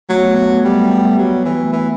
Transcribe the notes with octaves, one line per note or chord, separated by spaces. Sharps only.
F#3 A3
B3
A3
B3
A3
B3
A3
G3 B3
A3
B3
A3
B3
A3
F#3 B3
E3
A3
E3 B3